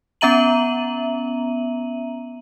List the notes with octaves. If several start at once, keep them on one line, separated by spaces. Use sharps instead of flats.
B3 C#4 E5 A#5 D#7 F#7